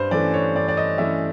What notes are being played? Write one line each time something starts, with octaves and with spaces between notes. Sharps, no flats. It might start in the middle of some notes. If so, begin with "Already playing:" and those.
Already playing: G2 B4 C5
E3 A3 C#4 D5
C#5
G2 D5
D5
D#5
E3 A3 C#4 E5